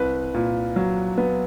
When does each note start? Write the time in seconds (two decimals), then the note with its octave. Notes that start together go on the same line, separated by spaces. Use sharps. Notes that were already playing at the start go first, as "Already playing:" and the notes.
Already playing: C2 B4
0.34 A#2
0.76 F#3
1.18 B3